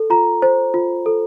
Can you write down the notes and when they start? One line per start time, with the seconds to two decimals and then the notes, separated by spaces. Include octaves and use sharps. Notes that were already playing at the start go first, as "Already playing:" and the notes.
Already playing: A4
0.10 F4 A#5
0.42 C5
0.74 F4
1.06 A4